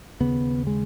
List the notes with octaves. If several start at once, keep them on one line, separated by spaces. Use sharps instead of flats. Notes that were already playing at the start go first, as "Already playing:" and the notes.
D#2 C#3 B3
G#3